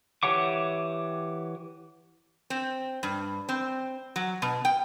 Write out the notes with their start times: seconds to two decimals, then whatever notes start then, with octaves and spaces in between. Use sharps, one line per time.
0.23 E3 G4 C#5 F#5 D6
2.50 C4
3.03 G2
3.49 C4
4.16 F#3
4.42 B2
4.65 G5